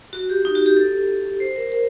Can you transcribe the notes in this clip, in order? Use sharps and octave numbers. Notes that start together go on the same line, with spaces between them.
F#4
G4
D#4
F#4
G4
A4
C5
A#4
A#4